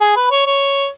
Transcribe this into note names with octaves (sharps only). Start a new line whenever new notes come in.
G#4
B4
C#5
C#5